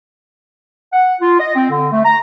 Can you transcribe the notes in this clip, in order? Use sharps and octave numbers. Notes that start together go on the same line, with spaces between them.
F#5
F4
D#5
C4
D3
A3
A#5